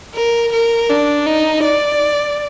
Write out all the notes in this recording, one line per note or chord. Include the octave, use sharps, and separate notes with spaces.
A#4
A#4
D4
D#4
D5